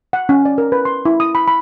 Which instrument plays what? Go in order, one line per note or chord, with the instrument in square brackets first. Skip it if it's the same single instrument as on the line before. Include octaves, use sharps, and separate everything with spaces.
[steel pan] F#5
C#4
D5
A#4
B4
C6
E4
D#6
B5
B5